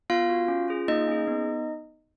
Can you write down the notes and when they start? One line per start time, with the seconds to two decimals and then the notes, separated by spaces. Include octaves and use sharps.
0.10 B3 F4 F5
0.30 F#4
0.48 C#4
0.68 F4 G#4
0.88 A#3 D#4 D#5
1.08 C#4 G#4
1.27 B3